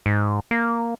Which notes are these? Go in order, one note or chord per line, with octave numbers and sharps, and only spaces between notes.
G#2
A#3